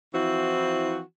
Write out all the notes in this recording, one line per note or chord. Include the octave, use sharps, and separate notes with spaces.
E3 F3 C4 E4 F#4